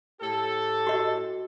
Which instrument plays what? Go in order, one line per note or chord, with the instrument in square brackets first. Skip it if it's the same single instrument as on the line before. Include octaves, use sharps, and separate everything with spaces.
[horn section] A2 G4 A4
[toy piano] F#4 D#5